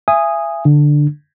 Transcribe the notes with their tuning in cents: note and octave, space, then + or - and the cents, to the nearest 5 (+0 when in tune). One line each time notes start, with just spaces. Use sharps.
E5 +35 G#5 -10 D#6 +0
D3 +0 D4 +10